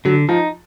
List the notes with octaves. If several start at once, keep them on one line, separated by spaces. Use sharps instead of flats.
D3 F#3
F3 D#4